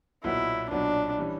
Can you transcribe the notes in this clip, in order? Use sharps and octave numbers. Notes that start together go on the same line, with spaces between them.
B1 A#2 F#3 B3 E4
B1 A#2 F#3 B3 D4
E3 G3 C#4